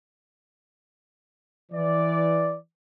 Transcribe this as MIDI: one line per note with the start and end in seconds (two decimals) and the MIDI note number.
1.72 2.57 52
1.72 2.57 74